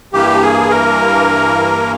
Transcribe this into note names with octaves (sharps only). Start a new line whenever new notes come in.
G2 E3 A#3 G4
G#4
A#4